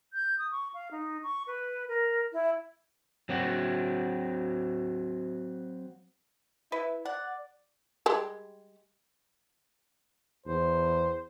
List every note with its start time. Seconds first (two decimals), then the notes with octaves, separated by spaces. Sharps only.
0.13 G6
0.38 D#6
0.51 C#6
0.73 F5
0.91 D#4
1.22 C#6
1.46 B4
1.88 A#4
2.32 E4
3.29 F#3 C4 F#4
6.72 E4 B4
7.05 D5 F#5
8.06 G3 G#3 G4
10.46 E2 C5